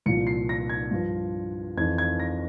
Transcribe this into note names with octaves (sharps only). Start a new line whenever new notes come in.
C2 A#2 F3 C#7
C7
A#6
G#6
G2 F3
F2 E3 G#6
G#6
A#6